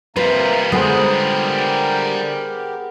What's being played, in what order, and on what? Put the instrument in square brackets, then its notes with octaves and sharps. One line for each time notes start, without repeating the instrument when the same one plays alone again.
[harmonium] C3 A#3 A#5 [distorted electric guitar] G3 F4 [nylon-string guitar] B4
[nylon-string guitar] D3 G#3 [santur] B3 G#4 C5 [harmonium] G4 A#4